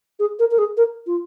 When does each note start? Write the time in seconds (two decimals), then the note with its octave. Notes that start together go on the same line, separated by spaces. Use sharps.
0.19 G#4
0.39 A#4
0.51 A#4
0.58 G#4
0.77 A#4
1.07 F4